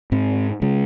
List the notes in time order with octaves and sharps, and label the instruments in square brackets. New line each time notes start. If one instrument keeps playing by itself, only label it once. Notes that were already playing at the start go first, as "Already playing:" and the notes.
[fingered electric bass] G#2 C4
C#3 G#3